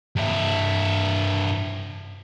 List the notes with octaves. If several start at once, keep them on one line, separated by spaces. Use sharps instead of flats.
G2 E4